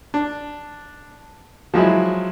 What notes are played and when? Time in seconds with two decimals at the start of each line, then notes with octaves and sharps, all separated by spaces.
0.14 D4
1.74 F3 F#3 G#3 E4